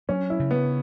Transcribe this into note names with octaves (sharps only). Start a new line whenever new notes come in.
F#3 C#4
E4
C#3
B3